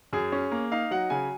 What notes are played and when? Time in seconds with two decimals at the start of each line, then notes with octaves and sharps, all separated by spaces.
0.13 F#2 G#4
0.32 C#4
0.52 A#3
0.72 D#4 F5
0.91 F#3 F#5
1.10 C#3 G#5